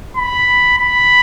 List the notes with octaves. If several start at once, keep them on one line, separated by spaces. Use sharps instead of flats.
B5
B5